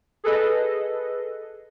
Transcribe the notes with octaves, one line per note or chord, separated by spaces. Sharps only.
G#4 A4 B4 D#5